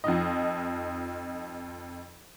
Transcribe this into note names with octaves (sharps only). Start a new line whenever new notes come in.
F2 F3 D#4 D#5